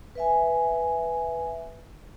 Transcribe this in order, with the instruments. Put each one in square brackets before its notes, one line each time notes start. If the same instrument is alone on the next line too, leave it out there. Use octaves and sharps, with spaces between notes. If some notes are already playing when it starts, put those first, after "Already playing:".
[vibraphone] B4 E5 G#5